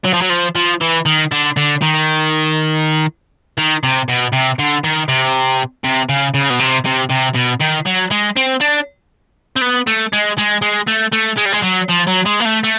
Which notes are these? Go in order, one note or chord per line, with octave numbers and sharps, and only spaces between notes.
F#3
F3
F#3
F3
F3
E3
D#3
D3
D3
D#3
D#3
C3
B2
C3
D3
D#3
C3
C3
C#3
C#3
B2
C3
C3
C3
B2
D#3
F#3
G#3
C4
D4
C4
B3
A3
G#3
G#3
G#3
A3
A3
G#3
G3
G#3
F#3
F3
F#3
G#3
A#3
A3
A3